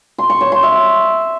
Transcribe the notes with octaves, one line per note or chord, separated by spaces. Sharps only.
C6
C#6
C#5
C6
E5